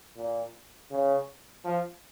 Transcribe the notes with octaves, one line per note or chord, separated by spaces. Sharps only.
A#2
C#3
F3